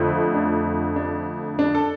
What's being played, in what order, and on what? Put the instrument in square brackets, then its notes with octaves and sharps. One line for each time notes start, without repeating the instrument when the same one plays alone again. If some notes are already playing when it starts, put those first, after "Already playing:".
Already playing: [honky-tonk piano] F2 D3 A3 [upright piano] C4
[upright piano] D4
D4
D4
A4